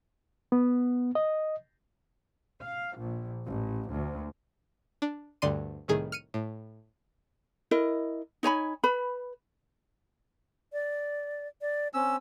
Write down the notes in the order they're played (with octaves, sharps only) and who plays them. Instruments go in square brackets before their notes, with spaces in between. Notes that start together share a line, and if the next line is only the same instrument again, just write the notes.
[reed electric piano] B3
D#5
[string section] F5
A#1
A1
D2
[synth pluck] D4
D2 G2 D3 D5 C6 D#7
C2 A2 D#3 G#4
F6 C#7 D#7
A2
[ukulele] E4 A#4 D#5
D#4 C#5 G#5 B5
B4 B5
[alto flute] D5
D5
[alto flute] C4 [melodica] C#4 E6